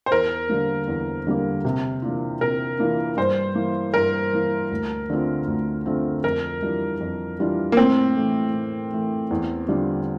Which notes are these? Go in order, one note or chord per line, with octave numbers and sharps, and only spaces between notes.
C5
E2 A#4
D3 G3 A#3
E2
D3 G3 A#3
C3
E3 A#3 D4 F4
C3 A#4
E3 A#3 D4 F4
G2 C5
E3 A#3
G2 A#4
E3 A#3
D2
D3 A3 C4 F4
D2
D3 A3 C4 F4
F2 A#4
E3 G3 D4 F4
F2
E3 G3 D4 F4
A#3
A2 C4
E3 A3
A2
E3 A3
E2
D3 G3 D4 F4